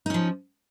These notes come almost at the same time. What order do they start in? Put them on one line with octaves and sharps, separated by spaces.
D#4 C#4 F3